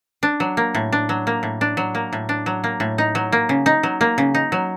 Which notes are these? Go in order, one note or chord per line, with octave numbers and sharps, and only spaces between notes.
D4
F#3
A#3
A2
D4
F#3
A#3
A2
D4
F#3
A#3
A2
D4
F#3
A#3
A2
D#4
F#3
A#3
C#3
D#4
F#3
A#3
C#3
D#4
F#3